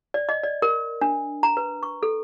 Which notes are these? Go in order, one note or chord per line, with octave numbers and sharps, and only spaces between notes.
D5
D#5
D5
A#4
D4
A#5
B4
C#6
A4